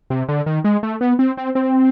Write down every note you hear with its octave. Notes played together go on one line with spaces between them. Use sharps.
C3
D3
D#3
G#3
A3
B3
C4
C4
C4